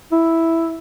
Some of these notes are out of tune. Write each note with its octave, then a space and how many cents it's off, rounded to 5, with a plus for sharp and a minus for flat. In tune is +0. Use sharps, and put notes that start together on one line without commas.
E4 +0